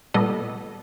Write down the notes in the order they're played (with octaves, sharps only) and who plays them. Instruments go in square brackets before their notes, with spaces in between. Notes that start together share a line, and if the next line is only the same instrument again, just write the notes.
[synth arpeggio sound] A#2 G3 B3 A4 D#5